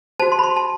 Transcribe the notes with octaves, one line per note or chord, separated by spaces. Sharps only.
F#4 C5 A5
C6
B5
C6
A5